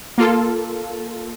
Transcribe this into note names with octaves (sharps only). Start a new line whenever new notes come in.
A#3 F4 A4